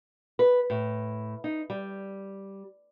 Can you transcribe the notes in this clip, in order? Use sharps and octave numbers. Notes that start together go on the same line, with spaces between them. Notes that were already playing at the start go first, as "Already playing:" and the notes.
B4
A2
D#4
G3